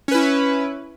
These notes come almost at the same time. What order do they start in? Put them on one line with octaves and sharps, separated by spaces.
C#4 B4 E4